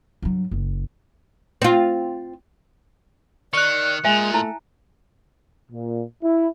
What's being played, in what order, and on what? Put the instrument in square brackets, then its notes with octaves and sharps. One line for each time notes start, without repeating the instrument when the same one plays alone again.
[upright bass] G2 F#3
F#1
[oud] C4 F4
[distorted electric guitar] D#3 [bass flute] D5 [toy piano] C#6 [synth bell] F#6 C#7
[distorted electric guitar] A#2 [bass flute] G#3 [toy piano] E5 G#5
[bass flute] A3 [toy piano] E4 A5 A#5
[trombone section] A#2
E4